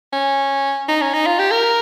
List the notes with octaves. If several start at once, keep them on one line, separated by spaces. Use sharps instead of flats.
C#4
D#4
C#4
D#4
F4
G4
A#4